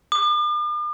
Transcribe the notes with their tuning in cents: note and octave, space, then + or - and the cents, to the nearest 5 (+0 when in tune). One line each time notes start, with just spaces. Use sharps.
D6 +45